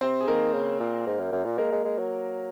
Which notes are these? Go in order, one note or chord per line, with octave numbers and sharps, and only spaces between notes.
C3 C4 C5
G#4
D#3 A#3 A#4
C#3
A#2
G#2
F#2
F#2
A#2
G#3 A#3 A#4
G#3
G#3
F#3